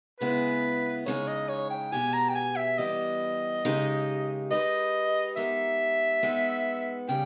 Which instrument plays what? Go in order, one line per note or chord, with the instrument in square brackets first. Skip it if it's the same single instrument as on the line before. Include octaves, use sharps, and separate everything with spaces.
[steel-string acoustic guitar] C#3 G#3 B3 E4 G#4 [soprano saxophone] B4
[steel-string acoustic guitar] C#3 G#3 D#4 [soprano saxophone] C#5
[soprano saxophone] D#5
C#5
G5
[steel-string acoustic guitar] B2 G#3 B3 G4 [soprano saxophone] G#5
[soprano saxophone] A#5
G5
G#5
E5
[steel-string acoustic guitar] E3 G3 B3 G4 [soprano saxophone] D#5
[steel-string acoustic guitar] C#3 G#3 D#4 G4 A#4
[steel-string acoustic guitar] G#3 D#4 G4 B4 [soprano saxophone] D#5
[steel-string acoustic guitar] G#3 B3 D#4 G4 A#4 [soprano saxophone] E5
[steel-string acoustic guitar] G#3 B3 D#4
[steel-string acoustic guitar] C#3 G3 [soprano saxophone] G5